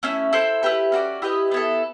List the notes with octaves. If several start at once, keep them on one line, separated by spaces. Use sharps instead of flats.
A3 C#4 E4
E4 A4 C5
E4 G4 B4
C#4 F#4 A4 D5
E4 G4 B4 D#5
B3 E4 A4